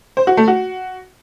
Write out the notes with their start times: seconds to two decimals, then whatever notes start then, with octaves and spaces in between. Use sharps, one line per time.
0.17 C5
0.27 F#4
0.37 A3
0.48 F#4